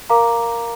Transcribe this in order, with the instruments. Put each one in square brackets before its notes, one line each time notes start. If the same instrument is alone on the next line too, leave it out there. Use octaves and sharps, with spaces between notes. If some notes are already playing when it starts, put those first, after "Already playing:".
[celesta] A#4 F5 A#5 D6